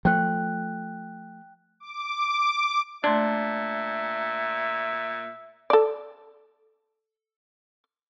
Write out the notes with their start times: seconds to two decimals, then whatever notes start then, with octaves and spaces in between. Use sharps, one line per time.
0.05 F3 A3 G5 F#6
1.80 D6
3.04 A#2 A3 D4 E5 C6 G#6
5.70 A4 D5